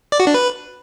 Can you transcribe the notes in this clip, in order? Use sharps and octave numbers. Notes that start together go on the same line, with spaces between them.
D5
F#4
D4
B4